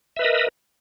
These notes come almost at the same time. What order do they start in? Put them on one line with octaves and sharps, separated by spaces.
E5 B4 D#5 A#4